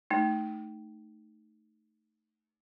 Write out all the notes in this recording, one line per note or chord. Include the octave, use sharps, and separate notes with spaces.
A3 D#4